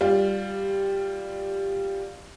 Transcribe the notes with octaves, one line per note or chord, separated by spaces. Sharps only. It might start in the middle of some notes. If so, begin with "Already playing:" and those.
G3 F4